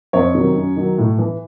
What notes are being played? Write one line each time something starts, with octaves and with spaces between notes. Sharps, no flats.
F2 C#5
C3 D#3 F#3
F#2
D#3 F#3
A2
E3